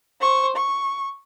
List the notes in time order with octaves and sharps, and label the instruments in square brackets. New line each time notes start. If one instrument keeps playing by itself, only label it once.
[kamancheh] C5 C#6
C#6